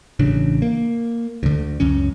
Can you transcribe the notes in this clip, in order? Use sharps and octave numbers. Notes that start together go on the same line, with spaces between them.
A1 C#3 D4
A#3
D2 D3
C#2 F#2 C#4